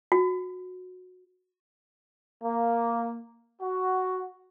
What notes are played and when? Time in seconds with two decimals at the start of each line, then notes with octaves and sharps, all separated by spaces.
0.12 F#4
2.44 A#3
3.62 F#4